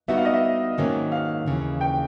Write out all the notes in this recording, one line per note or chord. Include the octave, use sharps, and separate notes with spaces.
G3 B3 D#4 F#4 E5
F5
D#5
E5
G#2 D#3 F#3 A#3 C#4
F5
D#2 C#3 E3
G5